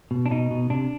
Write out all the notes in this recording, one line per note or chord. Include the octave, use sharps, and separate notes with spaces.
B2
D4
B2 D#4
B2
C3 D4